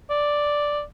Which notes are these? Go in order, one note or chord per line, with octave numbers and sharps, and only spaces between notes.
D5